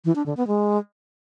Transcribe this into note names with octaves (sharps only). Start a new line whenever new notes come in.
E3
D4
D3
B3
G#3